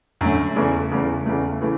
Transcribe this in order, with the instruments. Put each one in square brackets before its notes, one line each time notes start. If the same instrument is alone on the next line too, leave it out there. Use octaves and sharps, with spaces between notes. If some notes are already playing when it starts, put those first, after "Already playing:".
[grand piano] F#2 D3 A3
E2 C#3 E3 A3
E2 C#3 E3 A3
E2 C#3 E3 A3
C#3 E3 A3